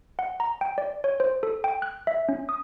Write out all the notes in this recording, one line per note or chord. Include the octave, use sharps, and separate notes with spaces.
F#5
A#5
G5
D5
C#5
C5
A4
G5
F#6
E5
C#4
D#6